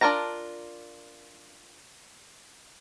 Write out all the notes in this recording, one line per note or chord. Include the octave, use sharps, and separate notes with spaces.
D4 F4 A#4 A5 A#5